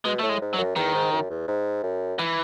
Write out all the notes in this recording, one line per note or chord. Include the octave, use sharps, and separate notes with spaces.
B2 G#3
A2 A3
G#3
G#2
F#3
F#2
E2 D#3
G#2
F#2
E2
G#2
F#2
E3